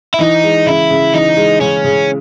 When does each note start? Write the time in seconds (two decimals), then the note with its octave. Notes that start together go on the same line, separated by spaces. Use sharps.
0.14 E4
0.20 E3 D#4
0.44 G#3
0.66 C#3 E4
0.90 C#3
1.14 E3 D#4
1.37 G#3
1.61 C#3 C#4
1.85 C#3